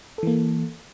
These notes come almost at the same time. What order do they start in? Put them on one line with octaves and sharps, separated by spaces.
A4 E3 A#3